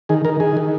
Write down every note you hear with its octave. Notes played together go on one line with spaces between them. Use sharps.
D#3 G#4
D#3 A#4
D#3 G#4
D#3